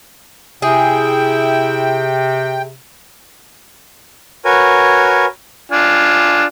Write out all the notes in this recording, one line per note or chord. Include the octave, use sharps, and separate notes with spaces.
C3 E4 G#4 G5
F#4 A#4 B4 C#5 G#5
D4 F4 G#5